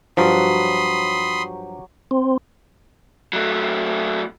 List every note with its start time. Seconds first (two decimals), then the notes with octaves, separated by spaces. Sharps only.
0.17 G2 F3 F#3 G4 C#5 B5 C6 D#6
2.11 C4
3.33 F#3 A3